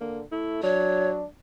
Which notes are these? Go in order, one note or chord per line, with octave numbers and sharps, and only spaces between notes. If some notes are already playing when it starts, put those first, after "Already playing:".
D3 A#3
A3 E4
F#3 D4 C#5